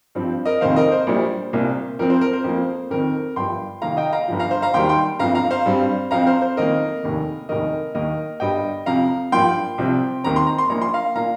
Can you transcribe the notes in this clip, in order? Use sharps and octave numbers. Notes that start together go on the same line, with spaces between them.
G2 F3 C4
A#4 D#5
F1 F2 D#3 A#3 C5 F5
A#4 D#5
C5
A#1 A#2 G3
C2 A#2 A#3
F2 F3 C4 A#4
C5
A#4
C5
F2 F3 A#3
F2 D#3 C4 A#4
G1 G2 F3 G5 C6
F2 C3 D#3 A#3 F5 A#5
D#5 G5
F5 A#5
G1 G2 F3
F5 A#5
C5
F5 A#5
D#2 D#3 G3 G5 C6
G5 C6
G1 F2 F3 F5 A#5
F5 A#5
C5 F5
G2 G3 C4
F2 F3 C4 F5 A#5
C5 F5
C5
F2 D#3 A#3 A#4 D#5
F1 D#2 D#3
F1 D#2 D#3 A#4 D#5
D#2 D#3 A#3 A#4 D#5
G1 G2 G3 D#5 G5
F2 C3 F3 F5 A#5
G2 F3 A#3 G5 C6
C2 C3 F3 C4
D#2 D#3 C4 A#5
C6
A#5
C6
A#1 A#2 A#3 A#5
C6
F5 A#5
A#2 A#3 F5 A#5